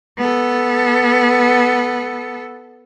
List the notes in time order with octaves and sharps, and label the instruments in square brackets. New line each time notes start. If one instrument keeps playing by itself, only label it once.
[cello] B3 A4